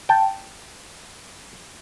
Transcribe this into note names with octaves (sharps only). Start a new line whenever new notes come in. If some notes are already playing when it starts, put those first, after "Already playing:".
G5 A5